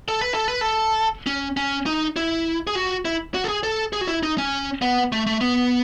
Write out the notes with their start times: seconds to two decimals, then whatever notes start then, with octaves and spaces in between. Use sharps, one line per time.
0.08 A4
0.21 B4
0.34 A4
0.48 B4
0.61 A4
1.27 C#4
1.57 C#4
1.86 D#4
2.16 E4
2.67 G#4
2.75 F#4
3.05 E4
3.34 F#4
3.44 A4
3.48 G#4
3.63 A4
3.93 G#4
4.01 F#4
4.07 E4
4.23 D#4
4.38 C#4
4.82 B3
5.12 A3
5.27 A3
5.41 B3